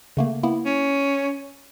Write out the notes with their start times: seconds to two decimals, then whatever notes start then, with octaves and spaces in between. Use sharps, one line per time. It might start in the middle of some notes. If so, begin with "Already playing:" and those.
0.17 C#3 A3 A#3
0.43 A#3 B3 E4
0.65 C#4